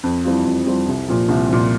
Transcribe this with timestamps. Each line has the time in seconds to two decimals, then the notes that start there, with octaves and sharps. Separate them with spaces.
0.04 F2
0.24 E3 G3 C4 F4
0.45 F2
0.66 E3 G3 C4 F4
0.87 C2
1.08 A#2 F3
1.29 C2
1.49 A#2 F3